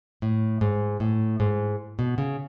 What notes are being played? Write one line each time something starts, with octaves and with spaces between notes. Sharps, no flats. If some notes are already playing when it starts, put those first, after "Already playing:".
A2
G#2
A2
G#2
B2
C#3